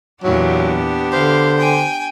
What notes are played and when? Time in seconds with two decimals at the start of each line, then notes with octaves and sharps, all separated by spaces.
0.23 E2 A#2 F#3 B3 D4 G4
1.13 D3 C5 F5
1.58 G5 G#5